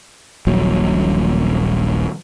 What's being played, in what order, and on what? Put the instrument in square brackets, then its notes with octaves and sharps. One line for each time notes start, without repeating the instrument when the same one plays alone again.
[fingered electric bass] D#1 A#1 F#3